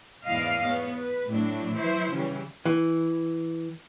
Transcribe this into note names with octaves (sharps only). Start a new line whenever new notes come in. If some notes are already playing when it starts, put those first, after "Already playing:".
E2 G#2 E4 D5 D#5 F5
B3 C#5
B4
A2 F#3 D4 E4
E3 F#3 E4 C5
C#3 E3 G3 C#4
E3